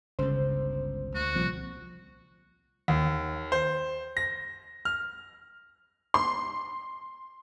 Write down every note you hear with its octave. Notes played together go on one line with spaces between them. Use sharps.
G1 C#2 C#3 C5
D2 F#4
C2 A#2 F3 G3 C4
D#2
C5
A#6
F6
C6